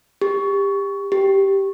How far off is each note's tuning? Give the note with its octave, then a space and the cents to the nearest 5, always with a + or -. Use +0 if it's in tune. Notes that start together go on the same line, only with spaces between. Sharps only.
G4 +20
G4 -5